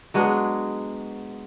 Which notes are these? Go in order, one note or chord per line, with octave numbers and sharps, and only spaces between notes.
F#3 G#3 B3 D4